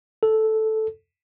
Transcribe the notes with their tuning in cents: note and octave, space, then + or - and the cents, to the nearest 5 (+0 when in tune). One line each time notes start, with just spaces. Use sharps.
A4 -5